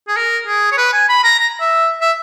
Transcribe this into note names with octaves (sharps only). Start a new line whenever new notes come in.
G#4
A#4
G#4
C#5
B4
G#5
B5
A#5
A#5
E5
E5